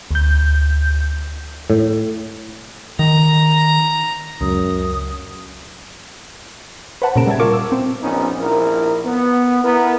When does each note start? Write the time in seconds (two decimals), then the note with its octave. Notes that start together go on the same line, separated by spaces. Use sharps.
0.11 D2 G6
1.70 A2
2.99 D#3 A#5
4.41 C#2 F#2 D#6
7.02 B4 C5 F#5 A5 B5
7.16 A#2 C#3 A#5 D7 E7
7.27 G3 E5 A5 G#6
7.40 F4 A#4 C#6 D6
7.53 E6
7.72 C4
8.03 A#1 B3 C#4 D#4
8.39 A#1 E4 A#4
9.05 B3
9.63 B3 E4 A#4